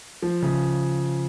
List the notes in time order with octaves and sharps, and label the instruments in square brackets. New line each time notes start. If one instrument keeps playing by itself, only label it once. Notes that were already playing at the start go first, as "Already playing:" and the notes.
[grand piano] F3
C#3